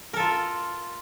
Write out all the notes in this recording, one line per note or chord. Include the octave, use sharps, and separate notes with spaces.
F4 A4 A#4